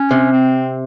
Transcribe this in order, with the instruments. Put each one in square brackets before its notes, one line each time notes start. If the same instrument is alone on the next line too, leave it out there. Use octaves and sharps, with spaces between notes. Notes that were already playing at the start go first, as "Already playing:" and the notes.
Already playing: [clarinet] C#4
[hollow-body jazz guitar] C3
[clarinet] C4